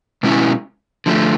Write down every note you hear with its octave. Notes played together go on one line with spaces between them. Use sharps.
B2 G#3 C#4 E4
D3 F3 A3